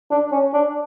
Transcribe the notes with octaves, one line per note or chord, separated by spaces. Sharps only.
D4
C#4
D4